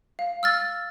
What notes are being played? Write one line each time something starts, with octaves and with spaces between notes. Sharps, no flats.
F5
E6 F6 A6